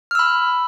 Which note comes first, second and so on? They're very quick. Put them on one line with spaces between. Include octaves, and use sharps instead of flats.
F6 E6 B5